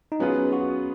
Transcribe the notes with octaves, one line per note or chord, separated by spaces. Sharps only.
D#4
F#3 B3 C#4 F4 G#4 B4
F#4